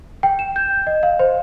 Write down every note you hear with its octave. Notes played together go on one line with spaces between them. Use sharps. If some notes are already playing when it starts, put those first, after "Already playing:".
G5
E7
G6
D#5
F5
C5